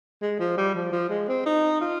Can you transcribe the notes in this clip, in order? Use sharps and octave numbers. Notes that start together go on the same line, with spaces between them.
G#3
F3
G3
F3
F3
G#3
C4
D#4
F4